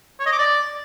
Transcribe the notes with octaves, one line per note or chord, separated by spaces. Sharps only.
C#5
D#5
D6
D5